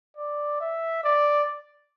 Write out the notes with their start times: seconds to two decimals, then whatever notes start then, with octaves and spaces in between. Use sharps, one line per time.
0.17 D5
0.60 E5
1.04 D5